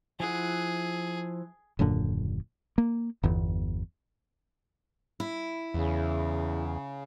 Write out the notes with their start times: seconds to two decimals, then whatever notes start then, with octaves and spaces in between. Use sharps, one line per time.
0.20 F3 E4 G#4 F#5
1.79 D#1 F#2 A#2 D3
2.78 A#3
3.23 G1 E2
5.20 E4
5.74 E2 C#3